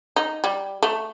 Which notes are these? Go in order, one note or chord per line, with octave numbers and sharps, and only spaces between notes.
D#4
G3
A3